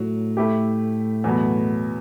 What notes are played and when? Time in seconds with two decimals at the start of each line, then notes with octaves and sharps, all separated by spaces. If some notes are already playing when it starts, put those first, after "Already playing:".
Already playing: A2 F#3
0.37 A3 E4 G4
1.24 E2 B2 F#3 B3